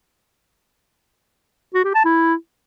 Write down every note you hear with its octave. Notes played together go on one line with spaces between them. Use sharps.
F#4
G4
A5
E4